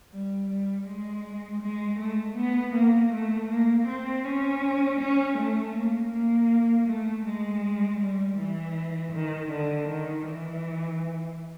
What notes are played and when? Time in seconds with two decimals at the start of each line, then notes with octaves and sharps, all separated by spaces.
0.12 G3
0.50 G3
0.87 G#3
1.62 G#3
2.00 A3
2.37 B3
2.75 A#3
3.12 A3
3.50 A#3
3.88 C4
4.25 C#4
5.00 C#4
5.38 A3
5.75 A#3
6.13 A#3
6.88 A3
7.25 G#3
8.00 G3
8.38 E3
9.13 D#3
9.51 D3
9.88 D#3
10.26 E3